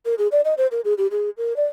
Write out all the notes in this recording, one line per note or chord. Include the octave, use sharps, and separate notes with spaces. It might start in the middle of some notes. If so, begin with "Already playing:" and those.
A#4
G#4
D5
D#5
C5
A#4
G#4
G4
G#4
A#4
D5